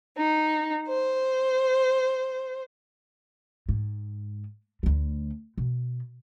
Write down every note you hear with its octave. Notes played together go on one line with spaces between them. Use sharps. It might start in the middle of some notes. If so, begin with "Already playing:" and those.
D#4
C5
G#2
D2 A3
B2